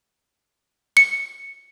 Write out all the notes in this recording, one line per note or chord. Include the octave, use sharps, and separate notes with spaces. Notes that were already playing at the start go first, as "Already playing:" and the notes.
C#7